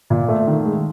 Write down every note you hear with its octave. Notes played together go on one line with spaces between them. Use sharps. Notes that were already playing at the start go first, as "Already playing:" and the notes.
A#2
A3
D#3
G#3